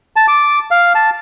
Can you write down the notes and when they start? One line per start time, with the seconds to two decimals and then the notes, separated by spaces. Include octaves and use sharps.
0.16 A5
0.28 D6
0.71 F5
0.95 A5